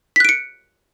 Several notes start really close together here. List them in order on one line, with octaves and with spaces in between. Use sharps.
B6 F#6 D7 C#7